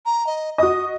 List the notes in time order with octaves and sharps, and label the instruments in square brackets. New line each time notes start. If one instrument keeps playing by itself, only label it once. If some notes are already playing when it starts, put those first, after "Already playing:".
[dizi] A#5
D#5
[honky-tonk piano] F#4 D#5 [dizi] D#6